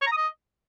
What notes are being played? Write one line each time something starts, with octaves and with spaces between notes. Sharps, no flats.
C#5
A#5
D#6
D#5